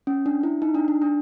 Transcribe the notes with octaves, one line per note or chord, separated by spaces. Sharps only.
C#4
D4
E4
D#4
D4
D4
D4